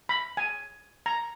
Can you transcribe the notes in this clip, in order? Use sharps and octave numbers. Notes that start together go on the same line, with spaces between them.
B5
G#5
A#5